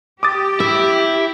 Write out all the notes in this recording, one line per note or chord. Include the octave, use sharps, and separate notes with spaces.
G4 D6 D#6 A6
E4 E5